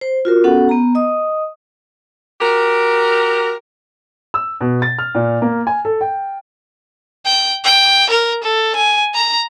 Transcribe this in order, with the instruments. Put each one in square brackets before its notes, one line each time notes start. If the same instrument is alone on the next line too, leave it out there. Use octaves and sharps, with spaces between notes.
[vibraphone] C5
F4 F#4 A#4
B3 C#4 F#4 A4 F#5
B3 A#5
D#5 D#6
[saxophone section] F#4 G4 A#4
[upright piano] E6
B2
A6
F6
A#2
A#3
G#5
A4
G5
[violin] G5
G5
A#4
A4
G#5
A#5